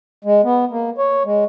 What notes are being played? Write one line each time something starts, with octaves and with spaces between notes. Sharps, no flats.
G#3
B3
A#3
C#5
G#3